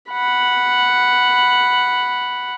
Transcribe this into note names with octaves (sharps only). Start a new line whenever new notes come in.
F#5 B5